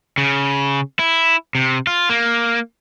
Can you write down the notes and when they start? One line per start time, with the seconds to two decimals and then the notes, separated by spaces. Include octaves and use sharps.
0.18 C#3
0.99 E4
1.55 C3
1.87 F4
2.10 A#3